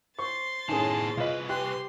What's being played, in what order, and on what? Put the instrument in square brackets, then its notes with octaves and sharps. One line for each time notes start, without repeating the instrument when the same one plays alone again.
[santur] C5 [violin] C6 A6 [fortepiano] C#6
[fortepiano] F#2 A2 D#3 [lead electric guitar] B3 A5 [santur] G#4 G#5
[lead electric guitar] C2 B4 [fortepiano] F4 D#5
[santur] G4 [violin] C6 [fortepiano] F#6